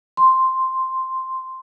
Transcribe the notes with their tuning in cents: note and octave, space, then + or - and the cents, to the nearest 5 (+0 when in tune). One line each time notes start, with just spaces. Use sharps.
C6 +0